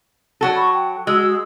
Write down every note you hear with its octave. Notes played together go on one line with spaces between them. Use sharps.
F#3 F#4 A4
B5 C#6
G5
G#3 F#4 D#6 E6